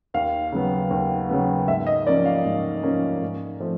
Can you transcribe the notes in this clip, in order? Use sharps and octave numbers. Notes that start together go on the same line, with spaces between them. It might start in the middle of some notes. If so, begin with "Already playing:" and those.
D#2 F5
C#3 F#3 B3
D#2
C#3 F#3 B3
G#2 E5
D#5
F3 A#3 C#4 D5
F5
G#2
F3 A#3 C#4
G#2
F3 A3 C4